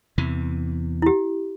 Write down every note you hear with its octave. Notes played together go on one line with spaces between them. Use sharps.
E2 C3 E3
E4 G4